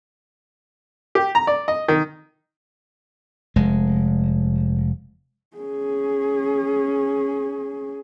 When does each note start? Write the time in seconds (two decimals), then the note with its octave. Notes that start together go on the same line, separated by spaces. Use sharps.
1.15 G4
1.35 A#5
1.47 D5
1.68 D#5
1.88 D#3
3.56 F1 G#3
5.57 C#4 G#4